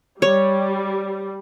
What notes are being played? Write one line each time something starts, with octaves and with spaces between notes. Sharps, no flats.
G3 C#5